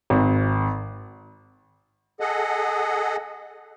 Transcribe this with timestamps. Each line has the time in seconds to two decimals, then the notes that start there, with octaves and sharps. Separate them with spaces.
0.10 G#1
2.20 G#4 A4 D#5 F#5